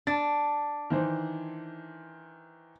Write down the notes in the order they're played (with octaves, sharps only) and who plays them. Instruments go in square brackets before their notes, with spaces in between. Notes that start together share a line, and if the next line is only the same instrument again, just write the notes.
[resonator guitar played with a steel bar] D4 [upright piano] A6
[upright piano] D#3 E3 C5